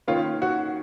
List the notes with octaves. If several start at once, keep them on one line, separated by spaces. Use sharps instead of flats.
D#3 A#3 C#4 F4
F#4